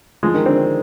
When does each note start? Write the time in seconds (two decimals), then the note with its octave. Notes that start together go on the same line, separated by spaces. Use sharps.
0.23 F3 G#3
0.34 D#3
0.46 D3 C4